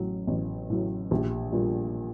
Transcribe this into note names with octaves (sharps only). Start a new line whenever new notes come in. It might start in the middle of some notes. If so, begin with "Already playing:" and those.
Already playing: A1 A2 F#3
A1
A2 F#3
A#1 G4
A#2 G3